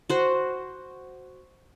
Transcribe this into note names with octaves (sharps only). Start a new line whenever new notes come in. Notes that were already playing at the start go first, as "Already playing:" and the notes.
F#4 C5